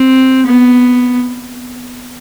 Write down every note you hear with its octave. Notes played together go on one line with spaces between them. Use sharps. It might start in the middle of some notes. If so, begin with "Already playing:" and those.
Already playing: C4
B3